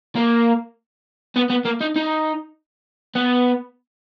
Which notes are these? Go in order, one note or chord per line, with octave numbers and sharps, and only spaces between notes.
A#3
B3
B3
A#3
D#4
D#4
B3